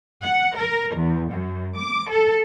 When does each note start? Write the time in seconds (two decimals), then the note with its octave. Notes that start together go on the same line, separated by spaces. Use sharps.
0.22 F#5
0.56 A#4
0.96 E2
1.31 F#2
1.78 D6
2.10 A4